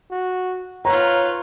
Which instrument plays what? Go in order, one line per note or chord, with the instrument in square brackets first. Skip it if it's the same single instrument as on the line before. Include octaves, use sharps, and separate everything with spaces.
[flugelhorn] F#4
[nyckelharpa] F4 B4 [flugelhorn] C#5 [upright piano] A#5